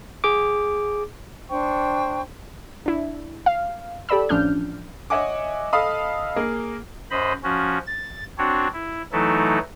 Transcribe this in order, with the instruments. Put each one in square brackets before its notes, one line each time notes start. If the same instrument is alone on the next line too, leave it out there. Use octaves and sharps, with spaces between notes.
[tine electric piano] G#4 D6
[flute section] D4 C5 G5 C#6
[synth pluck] D4 E4
F5
G4 A4 D5 B5 E6
A1 F3 C#4 D4 F6 G6
[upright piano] C#5 D#5 E5 F#5 G#5 D6
A4 D#5 F5 A5 B5 D#6
A#3 G#4 A#4
[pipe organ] F#2 C5 D#5 B5
F3 C#4 F#4
A6
C4 D4 F#4 C#5
E4
E3 F#3 A3 D#4 E4 A4